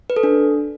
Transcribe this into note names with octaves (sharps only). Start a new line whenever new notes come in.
B4
A4
D4